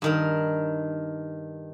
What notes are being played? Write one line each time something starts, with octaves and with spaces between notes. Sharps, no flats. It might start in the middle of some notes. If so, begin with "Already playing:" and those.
G2 D#3 A#4